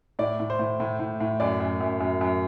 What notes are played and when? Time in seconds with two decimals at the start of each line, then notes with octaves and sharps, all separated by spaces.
0.19 A2 D5
0.40 A2
0.50 C5
0.59 A2
0.80 A2
1.00 A2
1.20 A2
1.40 F#2 D5
1.60 F#2
1.80 F#2
2.00 F#2
2.21 F#2